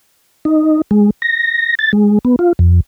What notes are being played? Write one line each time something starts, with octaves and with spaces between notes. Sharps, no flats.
D#4
G#3
A#6
A6
G#3
B3
F4
F2